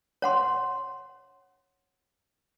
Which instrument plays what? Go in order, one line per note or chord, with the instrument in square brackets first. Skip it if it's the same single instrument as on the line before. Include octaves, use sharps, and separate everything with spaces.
[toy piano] C#5 F#5 C6